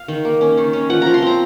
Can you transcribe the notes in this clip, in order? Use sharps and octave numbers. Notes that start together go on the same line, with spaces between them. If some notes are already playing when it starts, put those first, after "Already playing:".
Already playing: F5
D#3
A#3
C#4
D#3
C#4
F3 F#5
F3 A#5
C6
C4 A#5